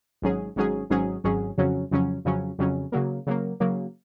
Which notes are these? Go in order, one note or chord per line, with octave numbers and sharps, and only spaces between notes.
G#1 G#2 F#3 C#4 G#4
G#1 G#2 F#3 C#4 G#4
G#1 G#2 F#3 C#4 G#4
G#1 G#2 F#3 C#4 G#4
F2 C#3 F#3 C#4
F2 C#3 F#3 C#4
F2 C#3 F#3 C#4
F2 C#3 F#3 C#4
C#3 F#3 A#3
C#3 F#3 A#3
C#3 F#3 A#3